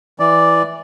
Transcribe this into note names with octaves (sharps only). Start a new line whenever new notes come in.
E3 D5